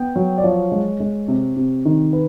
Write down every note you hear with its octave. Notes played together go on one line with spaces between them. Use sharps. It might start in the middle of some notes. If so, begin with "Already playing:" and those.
Already playing: B3 G5
F#3
D5
F3 C#5
G#3
G#3
C3
C3
D#3
B4